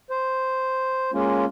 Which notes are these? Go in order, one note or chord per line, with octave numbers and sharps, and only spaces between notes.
C5
G#3 A#3 C#4 F4